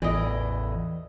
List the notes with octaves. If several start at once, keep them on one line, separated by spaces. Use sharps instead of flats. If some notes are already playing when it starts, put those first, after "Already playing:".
A1 E2 E3 D5 D#5